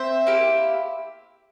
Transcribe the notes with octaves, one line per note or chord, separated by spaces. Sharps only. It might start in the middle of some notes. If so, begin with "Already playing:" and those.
Already playing: C4 C5 E5
A#3 E4 G4